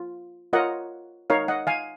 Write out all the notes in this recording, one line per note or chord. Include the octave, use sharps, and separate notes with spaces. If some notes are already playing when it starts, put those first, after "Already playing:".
Already playing: F4
F4 A#4 C#5 D#5 F#5
D#4 A#4 C#5 F5
D#5 F#5
F5 G#5